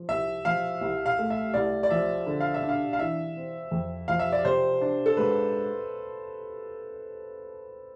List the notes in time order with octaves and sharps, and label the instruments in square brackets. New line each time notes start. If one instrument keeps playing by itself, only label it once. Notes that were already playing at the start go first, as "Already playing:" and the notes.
Already playing: [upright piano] F3
[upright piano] C2 [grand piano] E5
[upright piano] F3 [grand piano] F5
[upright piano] C2
[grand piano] F5
[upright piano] A3
[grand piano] E5
[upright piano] C2 [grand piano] D5
[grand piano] D5
[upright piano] F3 [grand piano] E5
[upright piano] D3
[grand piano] F5
E5
[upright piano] D4
[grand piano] F5
F5
[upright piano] E3 [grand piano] E5
[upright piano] C4
F2
[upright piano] F3 [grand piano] F5
[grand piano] E5
D5
[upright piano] C3 [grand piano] C5
[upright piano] D4
[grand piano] A4
[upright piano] G#2 [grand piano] B4